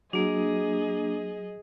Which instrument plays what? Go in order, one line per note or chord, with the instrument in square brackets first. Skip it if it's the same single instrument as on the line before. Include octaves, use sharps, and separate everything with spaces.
[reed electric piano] F#3 F#4 [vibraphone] A#3 D4 [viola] G#4 D#5